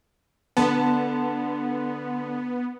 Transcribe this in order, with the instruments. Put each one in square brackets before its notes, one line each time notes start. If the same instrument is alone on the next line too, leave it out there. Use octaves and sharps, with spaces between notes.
[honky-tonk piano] D3 A5 [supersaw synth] B3